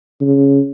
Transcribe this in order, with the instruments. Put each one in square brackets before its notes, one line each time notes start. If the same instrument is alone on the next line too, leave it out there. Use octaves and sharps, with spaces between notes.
[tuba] C#3